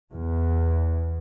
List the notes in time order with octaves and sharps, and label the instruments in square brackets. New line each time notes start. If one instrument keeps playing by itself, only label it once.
[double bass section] E2